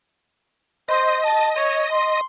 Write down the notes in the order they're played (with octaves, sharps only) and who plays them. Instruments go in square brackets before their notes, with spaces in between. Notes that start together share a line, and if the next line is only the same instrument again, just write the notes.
[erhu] C5 [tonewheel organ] D#5
[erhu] A5
C#5
C6